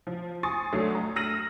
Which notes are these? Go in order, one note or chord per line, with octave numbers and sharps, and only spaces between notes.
F3
G#5 C6 C#6 D#6 A6
D2 F#3 A3 D4 C7
A#5
E6 F6 A#6 D#7 F#7